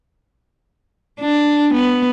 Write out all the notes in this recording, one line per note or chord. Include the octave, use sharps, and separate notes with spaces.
D4
B3